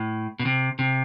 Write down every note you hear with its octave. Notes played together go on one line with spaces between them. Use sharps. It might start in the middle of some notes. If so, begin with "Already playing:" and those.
Already playing: A2
B2
C3
C3